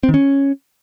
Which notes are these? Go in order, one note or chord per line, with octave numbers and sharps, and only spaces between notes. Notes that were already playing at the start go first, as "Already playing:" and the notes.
C4
D#3
C#4